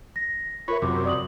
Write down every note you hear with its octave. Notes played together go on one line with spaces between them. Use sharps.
A#6
F4 A#4 B4 C#5 E5
F#2 C3 D6
D5 D#6 F#7